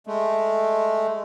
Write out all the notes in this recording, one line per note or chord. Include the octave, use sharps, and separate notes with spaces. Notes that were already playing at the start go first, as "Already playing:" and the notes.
G#3 A3